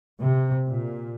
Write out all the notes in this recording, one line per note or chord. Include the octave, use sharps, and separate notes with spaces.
C3
A#2